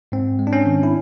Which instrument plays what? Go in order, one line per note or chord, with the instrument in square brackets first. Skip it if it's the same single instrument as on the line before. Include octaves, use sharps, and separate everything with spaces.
[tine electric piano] G#2 C4
G#3
D4
C#4
D#3
E4